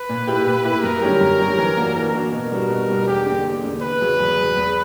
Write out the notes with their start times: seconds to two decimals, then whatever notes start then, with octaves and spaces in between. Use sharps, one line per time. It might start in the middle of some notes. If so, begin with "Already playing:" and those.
Already playing: B4
0.09 A#2
0.27 A#3 E4 G4
0.46 A#2
0.64 A#3 E4 G4
0.83 F#2 A#4
1.02 D3 G3 C#4 G4
1.20 F#2
1.39 D3 G3 C#4 G4
1.58 E3
1.77 A#3 D4 F#4
1.95 E3 A#4
2.14 A#3 D4 F#4
2.32 B2 A#4
2.51 G3 B3 D4 F#4
2.70 B2
2.88 G3 B3 D4 F#4
3.07 E2 G4
3.26 D3 A#3
3.45 E2
3.64 D3 A#3
3.82 E2 B4
4.01 C#3 F#3
4.19 E2
4.38 C#3 F#3
4.57 E2